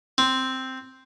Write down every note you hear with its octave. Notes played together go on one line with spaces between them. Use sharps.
C4